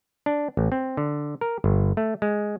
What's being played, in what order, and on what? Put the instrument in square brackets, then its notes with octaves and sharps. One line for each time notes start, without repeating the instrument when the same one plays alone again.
[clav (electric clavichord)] D4
A1
C4
D3
A#4
G1
A3
G#3